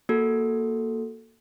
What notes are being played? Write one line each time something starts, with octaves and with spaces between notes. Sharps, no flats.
A#3 F#4 A4